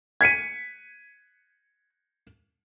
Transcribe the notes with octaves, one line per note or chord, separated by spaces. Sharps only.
G#6 B6 C#7 D#7